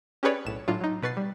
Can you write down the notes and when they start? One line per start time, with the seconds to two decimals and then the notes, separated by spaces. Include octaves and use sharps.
0.23 C#4 G4 G#4 B4 C#5 D5
0.45 B1 A2 E7
0.68 A2 F#3 D4 F4
0.80 F#3 D#4
1.03 B2 B4 C#6 A6 C7
1.17 G3